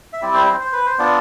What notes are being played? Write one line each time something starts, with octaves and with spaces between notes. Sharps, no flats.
E5
G3 C4 E4 D5
C5
C5
C5
B4
C5
B3 D4 F4 D5